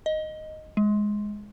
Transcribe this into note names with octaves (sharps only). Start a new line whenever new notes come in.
D#5
G#3